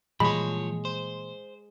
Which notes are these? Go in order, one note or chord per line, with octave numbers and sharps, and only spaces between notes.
A#2 E3 F3 G3 G#3 C#5 B5
C5